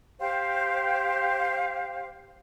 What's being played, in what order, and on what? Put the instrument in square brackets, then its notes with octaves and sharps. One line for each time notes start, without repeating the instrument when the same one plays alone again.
[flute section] G4 C5 F5 G5